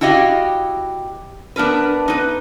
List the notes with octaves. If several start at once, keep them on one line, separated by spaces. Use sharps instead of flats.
E4 F#4 G4 D#5 F5
B3 D4 A#4 B4
D#4 B4